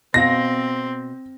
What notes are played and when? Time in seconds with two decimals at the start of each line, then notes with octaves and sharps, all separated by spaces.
0.14 B2 C4 C5 F5 A#6